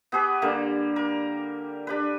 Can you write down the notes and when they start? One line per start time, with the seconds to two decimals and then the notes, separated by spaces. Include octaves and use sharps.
0.12 B3 G4 G#4 B4
0.42 D3 G3 A#3
0.96 A#4
1.87 D4 G4 B4